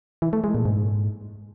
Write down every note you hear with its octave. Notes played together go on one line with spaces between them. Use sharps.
E3
A3
G#3
A#2
G#2